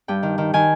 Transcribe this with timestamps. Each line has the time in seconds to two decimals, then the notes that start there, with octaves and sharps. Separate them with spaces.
0.08 G2 G5
0.23 D#3
0.38 D#3
0.53 D#3 G#5